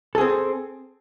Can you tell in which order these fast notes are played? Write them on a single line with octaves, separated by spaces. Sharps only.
A4 G#4 C4